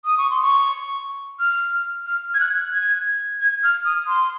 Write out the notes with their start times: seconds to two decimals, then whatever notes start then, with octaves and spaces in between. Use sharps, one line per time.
0.05 D#6
0.18 C#6
0.30 C6
0.42 C#6
1.40 F6
2.06 F6
2.34 G#6
2.40 F#6
2.74 G#6
3.40 G#6
3.64 F6
3.85 D#6
4.07 C6